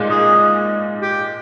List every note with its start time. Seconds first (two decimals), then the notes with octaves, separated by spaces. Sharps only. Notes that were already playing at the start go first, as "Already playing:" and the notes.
Already playing: A#2 G#3 D#4
0.10 G#4
1.02 G4